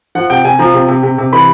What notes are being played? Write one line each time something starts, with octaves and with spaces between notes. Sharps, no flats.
F3 F#5
C3 G5
C3 G#5
F3 A#5
C3
C3
C3
C3
E3 B5